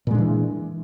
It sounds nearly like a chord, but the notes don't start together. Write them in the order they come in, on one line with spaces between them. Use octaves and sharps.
A#2 G#3 D4 E3